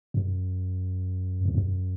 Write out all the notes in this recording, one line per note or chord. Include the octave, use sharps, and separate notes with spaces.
F#2
E2
F#2